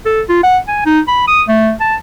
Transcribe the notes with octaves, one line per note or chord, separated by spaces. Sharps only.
A4
F4
F#5
G#5
D#4
B5
D#6
A3
A5